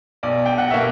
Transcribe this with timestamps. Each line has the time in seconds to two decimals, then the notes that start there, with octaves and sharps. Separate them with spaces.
0.23 B1 D5
0.46 G5
0.58 F#5
0.71 B2 A#3 E5